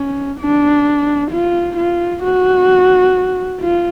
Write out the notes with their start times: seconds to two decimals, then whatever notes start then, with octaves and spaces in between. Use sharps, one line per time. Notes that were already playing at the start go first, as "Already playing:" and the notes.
Already playing: C#4
0.41 D4
1.32 F4
1.78 F4
2.23 F#4
3.60 F4